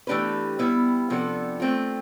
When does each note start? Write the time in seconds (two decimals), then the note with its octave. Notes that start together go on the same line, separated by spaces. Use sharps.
0.07 E3 A3 D4 G4 B4
0.59 G3 B3 E4
1.10 C3 F3 B3 D4 A4
1.60 A3 C4 F4